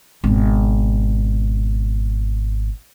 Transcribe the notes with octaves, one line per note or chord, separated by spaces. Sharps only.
G#1 B2